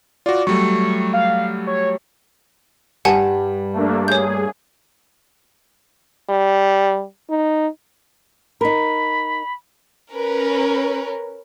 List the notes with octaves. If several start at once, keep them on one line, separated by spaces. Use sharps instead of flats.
F4 F#4 D5
F#3 G3 A3 C#6
F5
C#5
G2 G3 F#5 G#5 A5
A3 A#3 D4
G#4 C#5 G6
G3
D#4
D#4 A#4 B5
C#4 A#4 B4